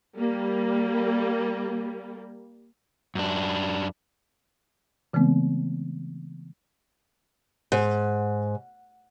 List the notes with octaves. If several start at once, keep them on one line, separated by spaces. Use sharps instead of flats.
G3 A#3
F#2 D4
C#3 E3 G#3 A3 B3 C4
G#2